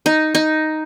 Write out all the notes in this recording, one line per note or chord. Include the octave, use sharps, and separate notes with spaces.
D#4
D#4